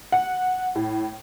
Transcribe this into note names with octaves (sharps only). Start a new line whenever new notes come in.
F#5
A2